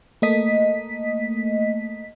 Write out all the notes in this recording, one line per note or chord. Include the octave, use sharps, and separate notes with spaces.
A3 A#3 D#5 B6